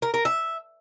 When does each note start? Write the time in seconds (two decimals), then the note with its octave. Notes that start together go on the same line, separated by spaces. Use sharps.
0.02 A#4
0.14 A#4
0.25 E5